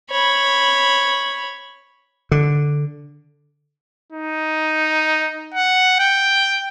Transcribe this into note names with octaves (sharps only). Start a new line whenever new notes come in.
C#5 B5
D3
D#4
F#5
G5